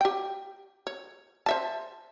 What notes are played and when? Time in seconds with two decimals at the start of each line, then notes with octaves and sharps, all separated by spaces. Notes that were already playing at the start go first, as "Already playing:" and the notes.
0.01 G4 G5
0.87 C#5
1.46 C5 E5 A5